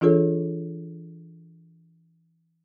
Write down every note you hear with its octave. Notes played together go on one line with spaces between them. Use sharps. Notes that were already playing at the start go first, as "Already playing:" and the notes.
E3 D4 F4 G#4 A4 C#5